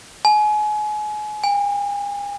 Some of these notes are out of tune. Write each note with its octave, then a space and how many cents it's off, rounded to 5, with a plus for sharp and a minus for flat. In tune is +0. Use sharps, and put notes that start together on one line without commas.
G#5 +30
G#5 -45